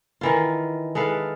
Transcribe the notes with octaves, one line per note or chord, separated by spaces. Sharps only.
D#3 E3 F4
G#3 A4 B4 F5